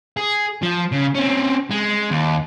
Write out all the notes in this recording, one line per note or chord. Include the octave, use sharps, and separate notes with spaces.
G#4
F3
C#3
C4 C#4
G#3
D#2